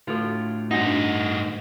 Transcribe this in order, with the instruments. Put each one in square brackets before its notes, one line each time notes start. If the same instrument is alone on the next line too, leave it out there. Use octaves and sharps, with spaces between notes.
[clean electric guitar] A2 D3 F4 [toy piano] F#4 A4
[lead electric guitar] G2 D#4 [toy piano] D4 F#4 F#5